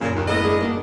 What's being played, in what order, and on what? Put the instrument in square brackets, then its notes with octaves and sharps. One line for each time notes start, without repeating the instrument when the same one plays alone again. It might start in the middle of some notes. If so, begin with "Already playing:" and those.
[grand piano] F#1 F#2 [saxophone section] A#2 C#3
[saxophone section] D#2
[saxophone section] A2 B3 D#5 [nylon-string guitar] A4 A#4 E5
[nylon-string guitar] A3 D4 G#4
A#3 D4 F#4